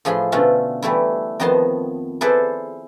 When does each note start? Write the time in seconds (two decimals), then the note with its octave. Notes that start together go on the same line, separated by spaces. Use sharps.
0.05 A2 F3 G#4 B5 C6
0.32 B2 D3 A3 C#4 F4
0.83 E3 G3 A3 E4
1.40 F2 D#3 B3 D#5 A5 C6
2.21 E4 G#4 A4 B4 C5 D5